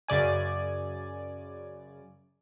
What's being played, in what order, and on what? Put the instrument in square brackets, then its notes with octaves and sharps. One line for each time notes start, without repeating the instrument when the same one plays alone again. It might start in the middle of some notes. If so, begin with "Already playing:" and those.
[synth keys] F#2 C#3 D5 G#5